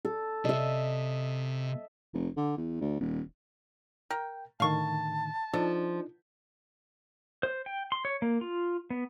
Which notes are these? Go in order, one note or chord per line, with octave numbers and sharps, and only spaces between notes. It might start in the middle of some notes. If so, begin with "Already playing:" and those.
A4
C3 D#5 E5
F1
D3
E2
D2
D#1
A#4 G5
A2 D3 D#3 F5 A5 C#6
F3 D4 D#4 A4
C5
G5
C6
C#5
A#3
F4
B3